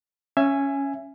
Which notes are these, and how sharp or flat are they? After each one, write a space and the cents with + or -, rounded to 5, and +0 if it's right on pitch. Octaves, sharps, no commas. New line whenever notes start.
C#4 +0 E5 +20 G#5 +0